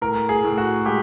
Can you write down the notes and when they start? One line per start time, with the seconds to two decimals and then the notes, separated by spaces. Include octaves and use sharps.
0.02 A2 A#4
0.29 G#4
0.44 A2
0.58 F#4
0.86 G#3 G4